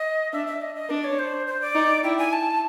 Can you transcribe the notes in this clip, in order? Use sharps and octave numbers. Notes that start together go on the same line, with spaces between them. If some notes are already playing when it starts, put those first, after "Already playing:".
Already playing: D#5
D4 E5
E5
D#5
D#5
D4 D5
C#5
C5
C5
D5
D#4
E4 G5
G#5
A5